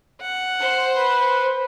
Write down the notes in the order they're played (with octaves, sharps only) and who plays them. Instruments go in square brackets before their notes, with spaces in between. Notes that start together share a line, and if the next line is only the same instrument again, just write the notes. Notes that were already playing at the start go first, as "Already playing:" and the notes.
[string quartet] F#5
[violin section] C5
[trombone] B4